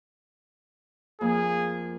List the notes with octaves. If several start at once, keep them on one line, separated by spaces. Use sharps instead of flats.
F2 A#3 G#4